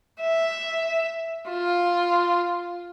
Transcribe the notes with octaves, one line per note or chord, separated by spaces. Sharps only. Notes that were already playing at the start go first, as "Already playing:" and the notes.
E5
F4